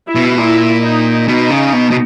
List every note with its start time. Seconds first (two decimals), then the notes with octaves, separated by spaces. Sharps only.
0.08 E4
0.15 B2
0.38 A#2 E4
0.83 D#4
1.28 B2 D#4
1.50 C#3
1.73 B2
1.91 B2